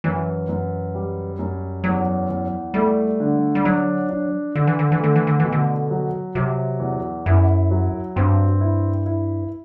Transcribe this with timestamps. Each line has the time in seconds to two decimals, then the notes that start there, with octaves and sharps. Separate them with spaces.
0.04 F#2 E3
0.49 F#2
0.95 G3
1.39 F#2
1.84 E2 F#3
2.29 E2
2.74 G3 A3
3.20 D3
3.55 G3
3.65 F#3 D4
4.09 D4
4.55 D3 D4
4.67 E3
4.79 D3
4.92 E3
5.00 D3 A3
5.16 E3
5.27 D3
5.40 B2 E3
5.52 D3
5.90 F#3
6.35 C3 F#3
6.80 E2
7.26 F#2 E4
7.71 F#3
8.16 G2 C4
8.61 E4
9.06 E4